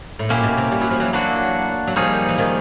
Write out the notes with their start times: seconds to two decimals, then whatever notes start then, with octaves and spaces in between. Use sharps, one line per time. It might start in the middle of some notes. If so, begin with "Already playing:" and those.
0.19 A2
0.30 A#2 A#3 C#4 E4 G4
0.43 B2
0.57 C3
0.72 G3
0.81 F#3
0.90 F3
1.00 E3 F#3
1.13 E3 F#3 A#3 D4 F#4
1.87 F#3
1.96 D#3 F3 G3 A#3 D#4 G#4 C#5
2.29 E3
2.38 D#3 F3